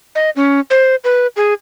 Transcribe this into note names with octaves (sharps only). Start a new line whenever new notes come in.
D#5
C#4
C5
B4
G#4